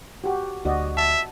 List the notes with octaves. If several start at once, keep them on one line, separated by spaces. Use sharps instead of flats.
F#4 G4
D2 F#4 D5 D#5
E5 A5